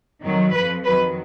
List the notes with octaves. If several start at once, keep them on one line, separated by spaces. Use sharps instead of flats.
F2 D#3 F#3
F2 F3 B4
F2 D#3 F#3 B4